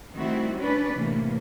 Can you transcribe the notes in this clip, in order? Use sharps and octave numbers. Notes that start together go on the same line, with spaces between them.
D#3 G3 A3 C4 E4 F#4
C#4 D4 B4 D5
A2 C3 E3 A#3